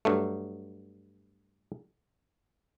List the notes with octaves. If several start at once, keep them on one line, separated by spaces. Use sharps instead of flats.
G2 F#3 A3